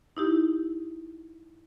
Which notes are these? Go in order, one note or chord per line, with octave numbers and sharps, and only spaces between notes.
D#4 E4 G4